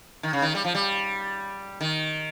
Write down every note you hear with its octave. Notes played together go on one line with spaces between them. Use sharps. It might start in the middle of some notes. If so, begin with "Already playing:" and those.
D#3
C#3
D#3
G3
F3
G3
D#3